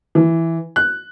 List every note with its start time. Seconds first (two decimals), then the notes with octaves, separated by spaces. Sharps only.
0.15 E3
0.76 F#6